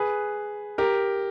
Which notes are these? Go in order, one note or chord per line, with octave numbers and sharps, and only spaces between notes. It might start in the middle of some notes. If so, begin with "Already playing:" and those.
Already playing: G#4 B4
G4 A#4